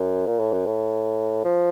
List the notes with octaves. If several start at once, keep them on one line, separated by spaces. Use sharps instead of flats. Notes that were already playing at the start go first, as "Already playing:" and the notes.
Already playing: F#2
A#2
A2
F#2
A2
F3